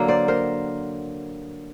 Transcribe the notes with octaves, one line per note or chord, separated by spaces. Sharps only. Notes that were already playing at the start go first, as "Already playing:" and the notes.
Already playing: D3 F#3 A#3
C5 D5
A#4 C5